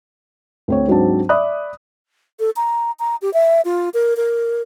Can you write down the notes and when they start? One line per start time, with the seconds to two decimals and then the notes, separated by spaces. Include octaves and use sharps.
0.68 D2 C4 C#5
0.88 G#2 F#3 C4 D4 A5
1.29 D5 E5 B5 D#6 F#6
2.40 A4
2.56 A#5
2.99 A#5
3.22 G4
3.34 E5
3.65 F4
3.94 A#4
4.17 A#4